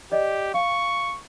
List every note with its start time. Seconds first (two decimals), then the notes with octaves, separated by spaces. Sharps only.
0.12 G4 D5 D#5
0.54 F5 C#6